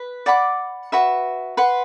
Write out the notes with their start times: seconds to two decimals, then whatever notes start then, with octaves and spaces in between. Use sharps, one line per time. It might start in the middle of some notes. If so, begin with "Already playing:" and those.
Already playing: B4
0.26 D5 F#5 B5 D6
0.92 F#4 B4 E5
1.57 B4 F#5 C6